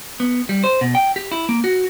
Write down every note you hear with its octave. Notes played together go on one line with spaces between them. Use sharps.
B3
G3
C5
B2
G5
G4
E4
A#3
F#4